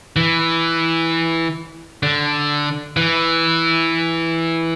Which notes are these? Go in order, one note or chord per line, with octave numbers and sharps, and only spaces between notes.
E3
D3
E3